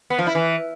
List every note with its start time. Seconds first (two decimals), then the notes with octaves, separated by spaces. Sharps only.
0.10 B3
0.19 F3
0.27 E4
0.35 E3